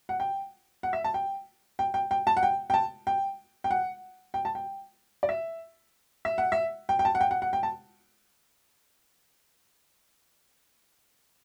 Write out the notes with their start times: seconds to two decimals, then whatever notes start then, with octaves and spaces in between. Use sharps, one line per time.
0.09 F#5
0.20 G5
0.83 F#5
0.93 E5
1.04 A5
1.14 G5
1.79 G5
1.94 G5
2.11 G5
2.27 A5
2.37 F#5
2.43 G5
2.70 G5
2.74 A5
3.07 G5
3.64 G5
3.71 F#5
4.34 G5
4.45 A5
4.55 G5
5.23 D5
5.29 E5
6.25 E5
6.38 F#5
6.52 E5
6.89 G5
6.99 G5
7.05 A5
7.15 F#5
7.21 G5
7.31 F#5
7.42 F#5
7.53 G5
7.63 A5